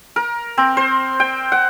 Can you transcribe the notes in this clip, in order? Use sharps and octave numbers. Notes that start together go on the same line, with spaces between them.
A#4
C4
C5
G5
F#5